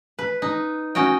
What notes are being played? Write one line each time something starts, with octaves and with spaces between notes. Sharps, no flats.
B4
D#4
C#4 F#4 D#5 G5